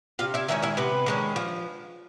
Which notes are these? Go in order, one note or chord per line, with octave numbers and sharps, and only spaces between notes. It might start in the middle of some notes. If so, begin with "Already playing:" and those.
C3 F4 F5
E4 E5
D#3 G#3 C#4 E4 E5
E4 E5
C3 B3 B4
D#3 G#3 C#4
F3